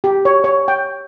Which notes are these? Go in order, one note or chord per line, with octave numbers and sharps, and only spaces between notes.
G4
C#5
C#5
G5